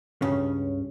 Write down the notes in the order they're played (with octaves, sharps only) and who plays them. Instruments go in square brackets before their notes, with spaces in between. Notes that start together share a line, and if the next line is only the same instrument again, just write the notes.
[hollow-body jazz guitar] C#2 G2 C#3 C#4